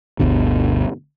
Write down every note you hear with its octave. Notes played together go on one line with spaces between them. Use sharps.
G1 D2 B2 D3